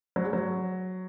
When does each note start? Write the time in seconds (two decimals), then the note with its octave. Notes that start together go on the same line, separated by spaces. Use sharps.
0.16 F#3
0.24 G#3
0.33 F#3